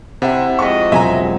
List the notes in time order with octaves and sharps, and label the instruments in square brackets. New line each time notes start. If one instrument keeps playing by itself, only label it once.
[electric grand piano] C3 E5 [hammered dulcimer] C4 E4 F#5
[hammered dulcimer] F3 [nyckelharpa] G#3 D#5 [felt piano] C#6 B6
[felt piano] E1 C3 F#3 [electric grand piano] E5 G#5 A#5